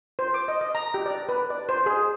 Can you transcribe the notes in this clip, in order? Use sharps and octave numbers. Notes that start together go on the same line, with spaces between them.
C5
D6
D#5
D#5
A#5
G4
D5
B4
D5
C5
G#4